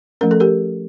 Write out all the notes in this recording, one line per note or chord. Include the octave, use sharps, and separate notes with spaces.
F3 A3 C#4 A#4
A4
G4 A#4